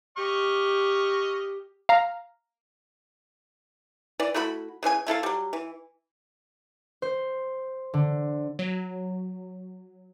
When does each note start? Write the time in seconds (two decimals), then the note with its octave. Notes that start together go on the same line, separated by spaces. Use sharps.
0.17 G4 D#5 C#6 F6
1.89 F5 A#5
4.20 E3 D5
4.34 A3 E4 F#4 B5
4.83 C#3 E3 C#4 G#5
5.07 A3 E4 A4 F5
5.23 F#3 G3
5.53 E3
7.02 C5
7.94 D3
8.59 F#3